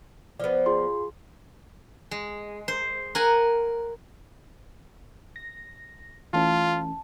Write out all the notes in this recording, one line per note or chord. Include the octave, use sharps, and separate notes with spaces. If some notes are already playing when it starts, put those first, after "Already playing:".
F3 B3 D5
F4 G#4 C6
G#3
C5
A#4 F#5 G#5
A#6
E3 A3 C#4 F4 A5